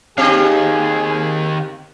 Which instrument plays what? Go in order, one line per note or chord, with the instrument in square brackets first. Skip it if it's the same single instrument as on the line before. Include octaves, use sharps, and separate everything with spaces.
[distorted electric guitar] D#3 F5 [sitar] C4 G4 D#5 [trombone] G#4